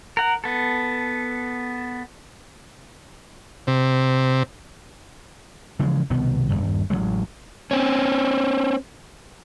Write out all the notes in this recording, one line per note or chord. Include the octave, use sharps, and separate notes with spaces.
A#4 F#5
B3 A4
C3
C#3 E3 F3 G#3
C2 B2 D#3 B3
D#1 C2 G2
A1 B2 F#3 G#3
C4 C#4